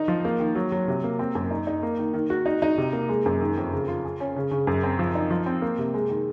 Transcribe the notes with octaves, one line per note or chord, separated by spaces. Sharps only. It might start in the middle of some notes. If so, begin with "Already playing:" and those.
Already playing: D#3 D#4
F3
A#3
D#3
F#3
F#3
C3
A#3
C4
F#2
D#4
D#4
A#3
D#3
D#3
F#4
D#4
D#4
C3
A#3
G#3
F#2
D#3
F2
C#3
F4
G#4
C#4
C#3
C#3
F#2
C4
F3
D#4
F3
C4
A#3
C3
G#3
D#3